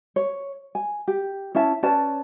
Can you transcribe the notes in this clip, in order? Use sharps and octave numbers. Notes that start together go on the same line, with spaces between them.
C#5
G#5
G4
C#4 E4 E5 A5
C#4 B4 D5 A5